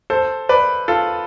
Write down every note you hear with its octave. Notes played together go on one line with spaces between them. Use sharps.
A4 C5
B4 D5
F4 A4